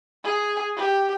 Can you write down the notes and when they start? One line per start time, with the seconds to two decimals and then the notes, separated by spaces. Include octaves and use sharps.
0.24 G#4
0.76 G4